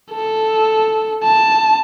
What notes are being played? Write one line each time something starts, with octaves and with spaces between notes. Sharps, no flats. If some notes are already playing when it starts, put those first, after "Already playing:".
A4
A5